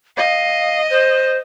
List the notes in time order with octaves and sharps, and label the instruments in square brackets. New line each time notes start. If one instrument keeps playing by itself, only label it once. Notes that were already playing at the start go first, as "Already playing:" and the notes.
[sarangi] D#5 [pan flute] F5
[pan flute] C5